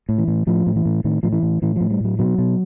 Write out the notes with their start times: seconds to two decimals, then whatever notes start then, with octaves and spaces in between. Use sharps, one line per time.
0.09 A2
0.18 E3
0.28 A2
0.47 A2 F3
0.67 A2
0.76 E3
0.85 A2
1.04 A2 D#3
1.23 A2 F3
1.33 E3
1.43 A2
1.62 A2 E3
1.76 A2 F3
1.91 G3
2.00 A2 F#3
2.19 B2 F#3
2.38 B2